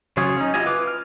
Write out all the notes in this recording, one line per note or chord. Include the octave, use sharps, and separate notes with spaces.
C#3 F#3 F4 G#4 C#5
C#4 D#4
E4 F4 G4 D#5 G#5
F4 B4 D6
F6